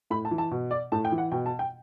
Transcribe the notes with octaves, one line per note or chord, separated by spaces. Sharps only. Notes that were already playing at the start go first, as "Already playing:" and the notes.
A2 B5
A5
E3
A5
B2
D5
A2 A5
G5
E3
F#5
B2 G5
A5
G5